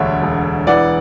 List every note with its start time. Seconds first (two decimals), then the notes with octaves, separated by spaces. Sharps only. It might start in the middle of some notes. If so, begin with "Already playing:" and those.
Already playing: E1 D2 D3 C#5 E5
0.22 E1
0.67 E3 D5 F#5